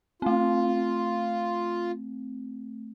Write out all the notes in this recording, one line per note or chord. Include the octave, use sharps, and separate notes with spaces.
A3 C4 F4